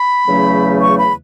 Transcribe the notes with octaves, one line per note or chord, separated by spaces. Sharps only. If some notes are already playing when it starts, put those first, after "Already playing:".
Already playing: B5
E2 C#3 F#3 A3 C#4
C#6
B5